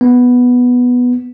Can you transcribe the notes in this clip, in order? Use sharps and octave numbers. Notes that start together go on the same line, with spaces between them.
B3